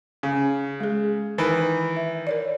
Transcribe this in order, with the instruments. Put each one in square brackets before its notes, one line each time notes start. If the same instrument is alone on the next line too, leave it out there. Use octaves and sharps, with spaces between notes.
[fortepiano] C#3
[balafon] G#3 G#4
[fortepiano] D#3 E3
[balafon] E5
A#4 C#5 D5